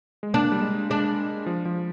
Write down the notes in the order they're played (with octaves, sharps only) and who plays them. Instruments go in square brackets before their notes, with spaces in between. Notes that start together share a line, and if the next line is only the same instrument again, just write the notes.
[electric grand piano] G#3
[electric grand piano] A#3 [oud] D4
[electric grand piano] G3
G#3
[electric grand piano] G#3 [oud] D4
[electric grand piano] F3
F3